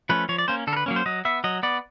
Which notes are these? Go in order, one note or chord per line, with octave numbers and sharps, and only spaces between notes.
F3 A3 C#4 B4
F3 C#5
D5
A#3 C#4 C5
D3 A4
A#4
B4
F#3 A#3 C#4
C5
F#3 D#5
B3 E5
F#3 D#5
B3 D5